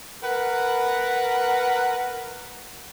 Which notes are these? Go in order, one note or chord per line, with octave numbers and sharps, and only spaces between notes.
A#4 B4 F#5